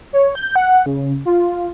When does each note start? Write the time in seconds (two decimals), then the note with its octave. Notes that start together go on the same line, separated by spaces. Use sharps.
0.13 C#5
0.35 G6
0.56 F#5
0.86 C#3
1.26 F4